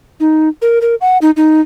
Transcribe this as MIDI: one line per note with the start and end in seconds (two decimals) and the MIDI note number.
0.20 0.49 63
0.62 0.79 70
0.81 0.95 70
1.01 1.18 78
1.22 1.31 63
1.37 1.61 63